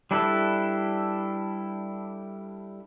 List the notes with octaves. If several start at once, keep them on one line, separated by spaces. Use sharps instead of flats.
G3 D4 E4 A4 B4